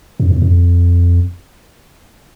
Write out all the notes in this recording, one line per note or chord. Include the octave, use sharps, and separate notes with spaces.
F2
E2
F2